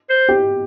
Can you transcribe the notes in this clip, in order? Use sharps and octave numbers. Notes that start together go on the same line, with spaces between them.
C5
G4